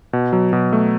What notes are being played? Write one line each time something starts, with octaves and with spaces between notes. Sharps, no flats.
B2
F#3
B2
A3